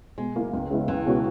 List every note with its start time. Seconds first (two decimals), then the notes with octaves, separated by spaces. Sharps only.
0.18 B2 G#3
0.36 A#3 E4
0.53 C#2
0.70 C#3 G#3 B3 E4
0.88 C#2 E3
1.06 B2 G#3 C#4 F#4